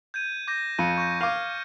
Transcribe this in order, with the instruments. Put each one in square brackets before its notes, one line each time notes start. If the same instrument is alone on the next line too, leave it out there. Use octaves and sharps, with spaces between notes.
[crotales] G6 G#6 D#7
D6 G6 A#6
[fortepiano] F2 [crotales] C#7 D#7
[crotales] C#6 G6 A#6
[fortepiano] F5 D6 [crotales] F6 G#6